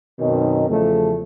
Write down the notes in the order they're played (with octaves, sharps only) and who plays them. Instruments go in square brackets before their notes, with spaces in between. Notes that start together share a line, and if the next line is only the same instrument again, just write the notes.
[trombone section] F#2 B2 D#3 C4 C#4 D#4
E2 C#3 F3 A3